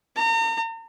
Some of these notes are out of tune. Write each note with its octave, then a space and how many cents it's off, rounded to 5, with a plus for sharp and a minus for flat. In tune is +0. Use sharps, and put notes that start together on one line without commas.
A#5 -40